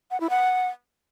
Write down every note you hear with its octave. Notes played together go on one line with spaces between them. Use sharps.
F#5
E4
F#5